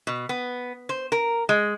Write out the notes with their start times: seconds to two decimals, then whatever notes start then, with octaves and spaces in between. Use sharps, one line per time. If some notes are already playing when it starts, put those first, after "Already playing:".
0.07 B2
0.29 B3
0.89 C5
1.12 A#4
1.49 G#3